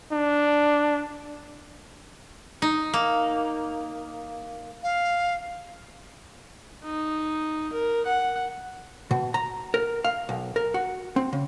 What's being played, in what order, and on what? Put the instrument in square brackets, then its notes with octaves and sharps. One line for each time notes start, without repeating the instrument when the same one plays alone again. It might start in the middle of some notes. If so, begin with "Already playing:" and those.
[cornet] D4
[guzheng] D#4
A#3
[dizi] F5
[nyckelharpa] D#4
A#4
F#5
[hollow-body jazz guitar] B2
A#5
A#4
F5
B1
A#4
F#4
C4
C#3